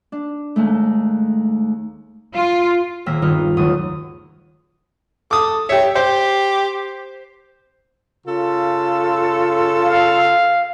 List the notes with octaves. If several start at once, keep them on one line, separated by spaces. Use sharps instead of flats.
D4
D#2 G#3 A3
F4
D#1 A#3 G5 E6 A#6 B6
G2 D#3 B3 D#4 F4
F#1 D#2 F#3 A3 D#6
A4 D6 D#6
G4 C#5 E5
G4 C5
C#3 F4 A4
F5